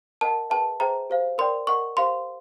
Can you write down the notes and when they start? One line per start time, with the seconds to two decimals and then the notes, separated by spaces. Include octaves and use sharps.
0.21 A#4 D#5 F#5 A5
0.50 G#4 B4 E5 G5 A5
0.80 G#4 C5 E5 G5 A#5
1.10 G4 C5 F5
1.38 A#4 D5 G5 C6
1.67 A#4 D#5 F#5 C#6
1.97 G4 C5 F5 C6